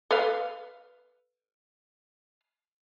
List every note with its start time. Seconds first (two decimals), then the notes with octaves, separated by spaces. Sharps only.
0.11 A4 B4 F5